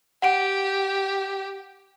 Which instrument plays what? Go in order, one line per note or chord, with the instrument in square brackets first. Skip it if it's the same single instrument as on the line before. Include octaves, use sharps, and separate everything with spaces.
[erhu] G4 [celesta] F#5 D7